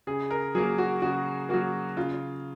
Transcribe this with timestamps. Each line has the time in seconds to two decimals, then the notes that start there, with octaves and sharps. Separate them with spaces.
0.07 C#3 G#4
0.31 A#4
0.55 F#3 A#3 G#4
0.78 F#4
1.02 C#3 F#4
1.49 F#3 A#3 F#4
1.97 C#3 F4